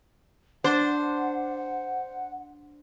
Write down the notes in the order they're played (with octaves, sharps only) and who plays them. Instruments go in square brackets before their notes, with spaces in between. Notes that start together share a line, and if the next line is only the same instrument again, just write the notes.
[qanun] D4 [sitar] C5 [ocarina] F#5